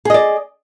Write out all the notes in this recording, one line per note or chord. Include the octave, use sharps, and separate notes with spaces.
G#4 D5 D#5